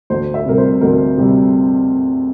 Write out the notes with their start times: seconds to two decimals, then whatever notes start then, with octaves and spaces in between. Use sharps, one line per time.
0.10 D2 C5
0.34 E5
0.46 C3 G3 A#4
0.58 C5
0.81 D2 A#4
1.18 C3 G3